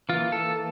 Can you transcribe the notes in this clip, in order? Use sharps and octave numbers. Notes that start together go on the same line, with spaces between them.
E3 A#3 F4
A4